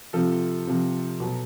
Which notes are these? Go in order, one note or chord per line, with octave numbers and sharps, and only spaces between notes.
C3 F3 A4
C3 F3
B2 F#3